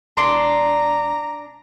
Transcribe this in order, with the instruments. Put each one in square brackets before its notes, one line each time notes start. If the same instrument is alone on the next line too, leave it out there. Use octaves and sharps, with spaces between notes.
[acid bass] E1 [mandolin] D4 D5 C6 [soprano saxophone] A#5